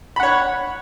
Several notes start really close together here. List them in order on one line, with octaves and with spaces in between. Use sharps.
B5 F#5 C#5